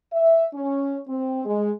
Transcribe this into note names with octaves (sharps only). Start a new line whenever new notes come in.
E5
C#4
C4
G#3